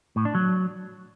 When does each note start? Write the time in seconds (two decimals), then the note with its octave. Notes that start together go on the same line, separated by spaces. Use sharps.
0.16 A2
0.25 D4
0.35 F#3